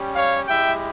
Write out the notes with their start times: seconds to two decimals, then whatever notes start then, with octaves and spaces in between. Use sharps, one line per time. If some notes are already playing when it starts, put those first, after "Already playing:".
Already playing: G3 C#4 G4
0.16 C#5 F5
0.48 G#3 E4 G4 E5 G5